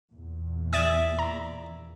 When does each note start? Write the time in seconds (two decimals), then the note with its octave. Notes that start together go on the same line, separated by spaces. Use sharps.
0.11 E2 A#2
0.73 D5 E5 G#5 D#6 A6
1.19 A#5